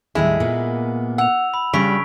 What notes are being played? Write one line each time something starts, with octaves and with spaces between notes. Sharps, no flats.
D#2 A2 G3 G#3 E4
A#2 A#3 B3
F#5 E6 F7
B5
G2 C#3 G3 F#4 C#6 B6 D7